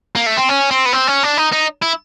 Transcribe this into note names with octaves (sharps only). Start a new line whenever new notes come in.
A#3
A3
C4
C#4
C4
B3
C4
C#4
D4
D#4
D#4
E4